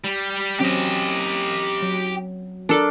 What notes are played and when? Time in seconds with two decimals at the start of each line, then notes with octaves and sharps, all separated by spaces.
0.04 G3
0.60 F#3 C4 C#4 G4 D#5
1.82 F#3
2.69 D4 A4 A#4 D5